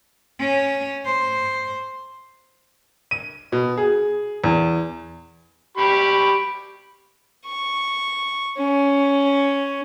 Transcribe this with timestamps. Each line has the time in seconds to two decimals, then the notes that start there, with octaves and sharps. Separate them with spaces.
0.39 C#4
1.06 C5
3.11 D#7
3.52 B2
3.78 G#4
4.44 E2
5.77 G4 B5 C#6
7.46 C#6
8.58 C#4